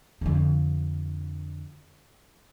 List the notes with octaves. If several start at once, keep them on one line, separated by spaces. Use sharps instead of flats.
F2 D3